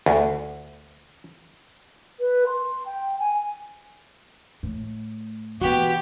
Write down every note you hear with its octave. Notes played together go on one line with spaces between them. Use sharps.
D2
B4
C6
G5
G#5
A2
B2 E3 B3 F#4 G4